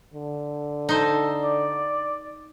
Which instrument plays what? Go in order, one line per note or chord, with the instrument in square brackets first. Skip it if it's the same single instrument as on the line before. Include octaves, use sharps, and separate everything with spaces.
[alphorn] D3
[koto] D#4 C5 [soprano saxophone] A4
[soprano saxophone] D5